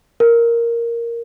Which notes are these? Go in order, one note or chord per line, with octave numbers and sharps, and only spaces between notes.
A#4